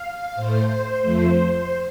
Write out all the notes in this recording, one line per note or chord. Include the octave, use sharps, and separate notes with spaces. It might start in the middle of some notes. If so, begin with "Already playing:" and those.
Already playing: F5
A2 A3 C5
F2 F3 A3